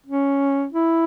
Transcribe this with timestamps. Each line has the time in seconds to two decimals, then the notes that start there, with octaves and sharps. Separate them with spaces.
0.06 C#4
0.72 E4